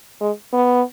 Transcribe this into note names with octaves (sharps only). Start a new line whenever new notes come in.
G#3
B3